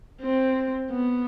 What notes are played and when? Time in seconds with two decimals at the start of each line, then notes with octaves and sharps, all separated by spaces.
0.22 C4
0.92 B3